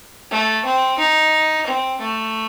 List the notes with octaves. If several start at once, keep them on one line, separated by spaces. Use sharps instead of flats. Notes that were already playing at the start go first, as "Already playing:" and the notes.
A3
C4
D#4
C4
A3